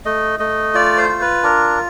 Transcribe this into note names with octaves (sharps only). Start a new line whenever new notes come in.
A3 D#5
A3 D#5
F4 D5
C5
F4
B4
D4 A#4